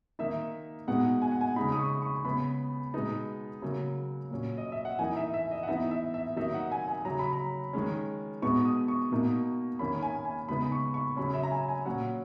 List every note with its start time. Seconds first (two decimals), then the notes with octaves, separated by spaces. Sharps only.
0.19 D#3 A#3 D#4 E5
0.87 B2 G#3 B3 D#4 F#5
1.22 G#5
1.31 F#5
1.41 G#5
1.56 C#3 G#3 D#4 B5
1.72 D#6
1.79 C#6
2.02 C#6
2.24 C#3 G#3 B3 B5
2.94 B2 G#3 B3 D#4
3.62 C#3 F#3 A#3
4.30 A#2 F#3 C#4
4.58 D#5
4.72 E5
4.85 F#5
4.99 E3 A#3 D#4 G#5
5.17 E5
5.34 E5
5.51 D#5
5.63 F#5
5.68 E3 B3 D#4 E5
5.91 E5
6.14 E5
6.36 D#3 F#3 A#3 D#4 E5
6.54 F#5
6.72 G#5
6.88 G#5
7.05 C#3 F#3 C#4 A#5
7.19 B5
7.33 A#5
7.73 D#3 G#3 C#4
8.42 B2 G#3 B3 D#4 C#6
8.65 D#6
8.88 C#6
9.12 B2 A#3 D#4
9.79 D#3 A#3 C#4 B5
10.02 G#5
10.25 G#5
10.49 C#3 G#3 B3 D#4 B5
10.72 C#6
10.94 C#6
11.17 C#3 F#3 C#4 B5
11.34 E5
11.43 A#5
11.51 G#5
11.68 G#5
11.85 A#2 F#3 C#4 F#5